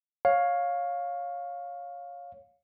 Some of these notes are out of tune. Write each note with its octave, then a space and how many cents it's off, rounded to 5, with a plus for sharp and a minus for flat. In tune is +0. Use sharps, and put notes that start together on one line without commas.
C#5 +0 F5 +15